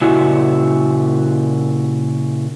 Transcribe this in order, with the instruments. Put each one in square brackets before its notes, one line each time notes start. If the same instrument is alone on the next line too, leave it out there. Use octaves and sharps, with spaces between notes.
[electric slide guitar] A#2 C#3 E4 F#4